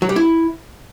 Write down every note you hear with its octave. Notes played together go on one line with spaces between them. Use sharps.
F#3
G3
E4